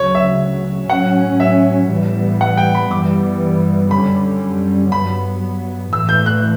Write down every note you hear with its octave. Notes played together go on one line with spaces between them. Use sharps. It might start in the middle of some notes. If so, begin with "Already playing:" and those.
Already playing: D2 C#3 F#3 C#5
E5
A2 F#3 C#4 F#5
E5
A2 E3 G3 B3
F#5
G5
B5
G2 E3 G3 B3 D6
F#2 D3 G3 C#4 B5
G2 F#3 B3 B5
A2 E3 A3 E6
G6
F#6